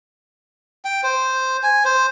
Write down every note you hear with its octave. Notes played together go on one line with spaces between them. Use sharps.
G5
C5
G#5
C5